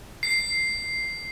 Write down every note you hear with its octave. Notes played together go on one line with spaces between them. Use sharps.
C7